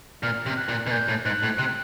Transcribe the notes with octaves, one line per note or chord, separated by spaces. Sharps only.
A#2 F6
C3
F#6
A#2
B2
A#2 G6
A2
G#2 F#6
A2
C3 F#6